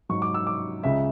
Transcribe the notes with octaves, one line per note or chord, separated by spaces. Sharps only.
G#2 F#3 C#6
D6
E6
D6
C#2 C#3 G#3 E5